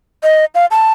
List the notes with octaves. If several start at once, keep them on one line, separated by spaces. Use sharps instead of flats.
D#5
F5
A5